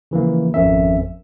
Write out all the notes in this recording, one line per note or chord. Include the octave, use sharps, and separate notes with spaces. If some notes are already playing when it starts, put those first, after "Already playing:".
C#3 E3 F3 A#3
G#1 F2 F3 C#4 A#4 E5